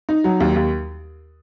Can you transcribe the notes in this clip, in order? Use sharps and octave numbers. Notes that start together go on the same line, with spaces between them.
D#4
F#3
D#2
D#2